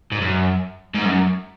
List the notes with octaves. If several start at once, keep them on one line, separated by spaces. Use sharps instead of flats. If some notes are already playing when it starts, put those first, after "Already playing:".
G#2
F#2
G#2
F#2